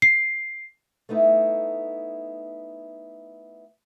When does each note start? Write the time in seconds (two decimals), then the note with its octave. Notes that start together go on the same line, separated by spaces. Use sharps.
0.02 C7
1.09 A3 B3 D#4 E4